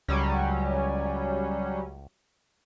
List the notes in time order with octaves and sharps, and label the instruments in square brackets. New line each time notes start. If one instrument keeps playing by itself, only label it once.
[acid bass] C#2 [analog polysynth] F#3 G3 C#4